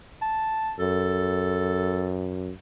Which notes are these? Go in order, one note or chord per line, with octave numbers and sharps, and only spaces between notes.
A5
F#2 A4